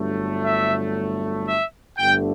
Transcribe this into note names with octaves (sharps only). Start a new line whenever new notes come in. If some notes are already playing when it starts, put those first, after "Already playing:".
Already playing: G1 G2 F#3 A3
E5
E5
G1 G2 D3 A3 G5